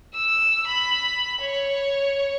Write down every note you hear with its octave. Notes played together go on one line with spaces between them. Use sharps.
E6
B5
C#5